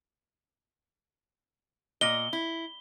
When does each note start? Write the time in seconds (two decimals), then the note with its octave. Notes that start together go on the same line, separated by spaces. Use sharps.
2.01 A#2 D#5 G7
2.33 E4